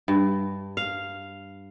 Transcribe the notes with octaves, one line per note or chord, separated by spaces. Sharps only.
G2
F5